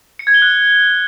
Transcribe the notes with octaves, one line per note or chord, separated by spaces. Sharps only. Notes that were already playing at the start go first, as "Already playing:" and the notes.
C#7
G#6
G7
F#6